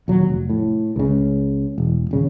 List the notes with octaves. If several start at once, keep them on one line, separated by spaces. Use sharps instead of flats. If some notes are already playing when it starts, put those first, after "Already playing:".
D#1 F#3
F1
A2
C#2 C#3
E1
D#1 C#3